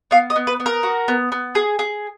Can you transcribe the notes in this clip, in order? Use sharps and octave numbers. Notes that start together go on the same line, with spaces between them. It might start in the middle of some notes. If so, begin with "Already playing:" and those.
B3 F5
D#5
B3
B4
B3
A#4
F#4
B3
B3
G#4
G#4